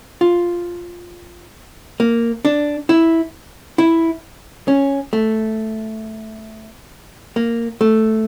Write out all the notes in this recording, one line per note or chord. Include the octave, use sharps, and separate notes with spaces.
F4
A#3
D4
E4
E4
C#4
A3
A#3
A3